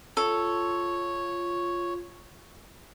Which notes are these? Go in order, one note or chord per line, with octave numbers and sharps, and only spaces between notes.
F4 A4 C#5